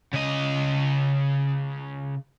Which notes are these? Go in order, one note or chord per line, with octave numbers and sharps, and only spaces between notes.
C#3 D#5